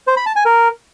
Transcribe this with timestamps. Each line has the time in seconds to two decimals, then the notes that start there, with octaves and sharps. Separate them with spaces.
0.07 C5
0.17 B5
0.26 A5
0.36 G#5
0.45 A#4